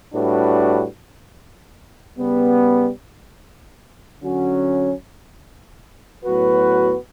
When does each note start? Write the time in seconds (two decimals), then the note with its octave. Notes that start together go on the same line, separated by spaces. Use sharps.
0.14 A2 G3 D4 F#4 B4
2.18 C#3 G3 B3
4.21 D3 F#3 C#4 F#4
6.25 A2 F#3 B3 F#4 B4